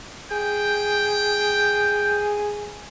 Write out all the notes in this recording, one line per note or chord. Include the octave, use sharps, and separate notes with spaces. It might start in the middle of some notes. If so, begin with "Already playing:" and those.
G#4 G5